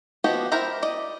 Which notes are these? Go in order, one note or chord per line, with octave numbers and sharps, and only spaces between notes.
F3 B3 F#4 G4 D#5
E4 G4 A#4 C5 A#5
D5 D#5